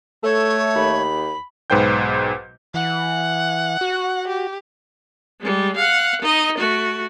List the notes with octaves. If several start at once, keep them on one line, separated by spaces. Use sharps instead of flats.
A3 A4 C#5
D#2 B5
B1 G#2 B4 C5 G5 G6
E3 F#5
F#4
G4
G3 G#3
F5 F#5
D#4 D#5
A3 F#4